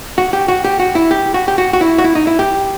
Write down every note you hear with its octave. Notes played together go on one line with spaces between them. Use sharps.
F#4
G4
F#4
G4
F#4
E4
G4
F#4
G4
F#4
F#4
E4
F#4
E4
D#4
E4
G4